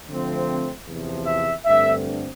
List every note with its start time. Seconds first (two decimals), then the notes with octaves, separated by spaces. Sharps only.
0.08 D3 F3 A3 C4
0.87 E2 C3 F3
1.26 E5
1.66 G2 D3 A3 C4 E5